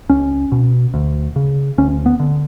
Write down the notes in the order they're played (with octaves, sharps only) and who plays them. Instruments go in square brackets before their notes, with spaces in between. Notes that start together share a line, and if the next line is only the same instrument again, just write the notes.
[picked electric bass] C#2 C#4
B2
D2
C#3
D2 C#4
B3
D3